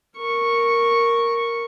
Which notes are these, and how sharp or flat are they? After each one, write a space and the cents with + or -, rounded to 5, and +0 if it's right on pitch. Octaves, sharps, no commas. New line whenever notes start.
A#4 +0 C#6 -5